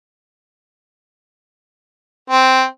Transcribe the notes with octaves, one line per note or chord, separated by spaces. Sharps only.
C4